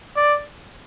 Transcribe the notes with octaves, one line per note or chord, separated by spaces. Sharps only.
D5